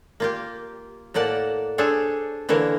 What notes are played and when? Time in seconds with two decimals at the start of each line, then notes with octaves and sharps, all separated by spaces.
0.20 A#3 F4 G4
1.14 A2 A#3 D5 F#5 A5
1.78 D4 G#4 A4 C5 C#5
2.49 D3 E3 A#3 A#4 C#5